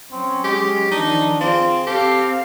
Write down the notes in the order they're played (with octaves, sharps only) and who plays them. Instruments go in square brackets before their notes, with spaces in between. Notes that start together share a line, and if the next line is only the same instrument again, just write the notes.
[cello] F#3 C#4 [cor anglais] C4
[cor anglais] G#3 [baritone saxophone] G4
[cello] D#3 F3 [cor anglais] D4 [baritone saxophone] D#4
[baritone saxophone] C4 [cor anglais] F4 [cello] G#4
[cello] C4 F5 [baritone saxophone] G4 [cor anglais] A4